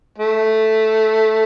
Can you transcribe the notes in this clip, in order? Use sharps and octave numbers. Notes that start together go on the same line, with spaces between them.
A3